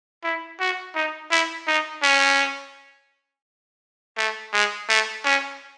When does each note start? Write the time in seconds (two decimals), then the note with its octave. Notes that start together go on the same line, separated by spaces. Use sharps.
0.24 E4
0.60 F#4
0.95 D#4
1.31 E4
1.67 D#4
2.03 C#4
4.17 A3
4.53 G#3
4.89 A3
5.25 C#4